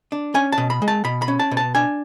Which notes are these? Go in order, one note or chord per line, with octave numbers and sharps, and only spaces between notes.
D4
C#4 G#5
A5
B2
B5
G#3
A5
B2 B5
B5
C#4
A5
B2
A5
D4 G#5